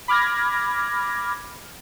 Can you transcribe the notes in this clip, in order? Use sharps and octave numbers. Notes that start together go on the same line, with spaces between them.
B5 D6 F6 G#6 A#6